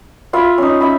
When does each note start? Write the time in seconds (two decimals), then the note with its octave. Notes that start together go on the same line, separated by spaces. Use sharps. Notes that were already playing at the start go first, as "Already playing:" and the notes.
0.33 F4 E5 F5 B5
0.58 C#4 D#4
0.80 C#4 E5 B5